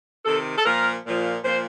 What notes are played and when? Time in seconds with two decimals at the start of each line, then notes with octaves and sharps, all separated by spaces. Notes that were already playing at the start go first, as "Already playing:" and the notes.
0.24 C3 D#3 A4
0.57 A4
0.64 A#2 F3 A#4
1.05 A#2 F3
1.43 A#2 F3 C5